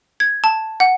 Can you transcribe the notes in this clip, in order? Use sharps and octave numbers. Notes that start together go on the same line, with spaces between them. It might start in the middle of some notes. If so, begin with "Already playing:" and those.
G#6
A5
F#5